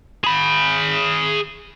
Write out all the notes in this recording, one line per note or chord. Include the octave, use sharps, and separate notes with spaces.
G#4 B5